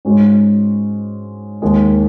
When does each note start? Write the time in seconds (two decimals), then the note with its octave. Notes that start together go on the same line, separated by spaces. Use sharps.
0.05 G#2 G#3 C#4 F#4
1.62 D#2 D#3 G#3